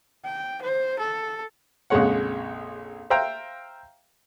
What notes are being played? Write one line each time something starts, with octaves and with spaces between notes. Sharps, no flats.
G5
C5
A4
A#1 F2 C#3 G#3 C#5 F#5
C5 E5 F5 G5 A#5